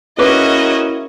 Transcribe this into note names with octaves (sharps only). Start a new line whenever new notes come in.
A#3 C#4 E4 F#4 G#4 B4 D#5 D6